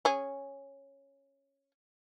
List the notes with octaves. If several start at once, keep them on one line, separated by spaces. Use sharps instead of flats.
C#4 G#4